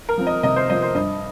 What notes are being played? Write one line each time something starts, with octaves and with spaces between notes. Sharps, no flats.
A#4
F3 C4
D#5
C3 D#5
C5
F3 C4 D#5
C5
G2 D#5